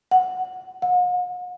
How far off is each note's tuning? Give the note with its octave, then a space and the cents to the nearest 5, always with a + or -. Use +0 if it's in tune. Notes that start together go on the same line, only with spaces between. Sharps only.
F#5 +10
F#5 -45